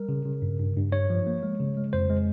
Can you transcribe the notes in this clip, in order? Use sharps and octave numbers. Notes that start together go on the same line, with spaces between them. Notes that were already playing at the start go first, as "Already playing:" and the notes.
Already playing: G3 A#4
C#3
C#3
G2
G2
G2
G2 C#5
F3
A#3
G#3
C#3
G#3
F2 C5
G#3